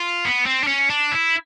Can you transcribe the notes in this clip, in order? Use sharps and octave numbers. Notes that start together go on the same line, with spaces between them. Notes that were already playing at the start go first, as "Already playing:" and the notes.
Already playing: F4
B3
C4
D4
C#4
D4
E4